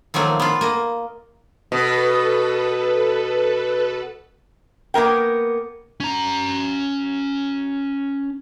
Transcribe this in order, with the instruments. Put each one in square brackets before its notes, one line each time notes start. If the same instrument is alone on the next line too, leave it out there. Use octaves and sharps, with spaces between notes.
[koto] D#3 F3 F#3 A3 A#3
B3 F4
A#3 D#5
[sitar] B2 [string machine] A4 B4
[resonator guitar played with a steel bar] A#3 B3 A#4 G5
[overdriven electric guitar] C#4 A#5